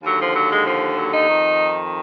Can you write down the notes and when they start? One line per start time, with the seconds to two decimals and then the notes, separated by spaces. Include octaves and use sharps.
0.03 D#2 D3 F#3
0.20 F3
0.35 F#3
0.51 G#3
0.65 F3
0.97 F#3
1.13 D#4
1.28 F2 D#3